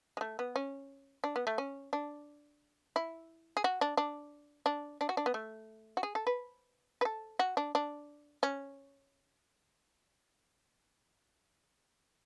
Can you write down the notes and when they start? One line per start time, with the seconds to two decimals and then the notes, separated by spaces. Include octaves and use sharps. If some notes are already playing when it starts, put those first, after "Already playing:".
0.17 G#3
0.21 A3
0.39 B3
0.56 C#4
1.24 D4
1.36 B3
1.47 A3
1.58 C#4
1.93 D4
2.96 E4
3.57 G#4
3.64 F#4
3.81 D4
3.97 D4
4.66 D4
5.01 D4
5.09 F#4
5.17 D4
5.26 B3
5.34 A3
5.97 F#4
6.03 G#4
6.15 A4
6.27 B4
7.01 B4
7.05 A4
7.39 F#4
7.57 D4
7.75 D4
8.43 C#4